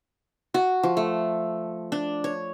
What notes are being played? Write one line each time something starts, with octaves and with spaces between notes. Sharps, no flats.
F#4
F3
A3
D4
C#5